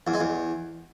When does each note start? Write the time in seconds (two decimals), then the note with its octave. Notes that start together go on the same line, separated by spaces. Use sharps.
0.07 E2
0.14 G#3
0.21 E2